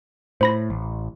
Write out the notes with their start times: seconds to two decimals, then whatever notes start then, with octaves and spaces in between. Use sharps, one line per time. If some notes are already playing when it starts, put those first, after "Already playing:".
0.41 A2 C5 B5 A#6
0.70 A1